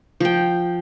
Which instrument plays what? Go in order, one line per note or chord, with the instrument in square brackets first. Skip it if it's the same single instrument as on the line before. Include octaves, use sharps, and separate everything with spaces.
[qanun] F3 G5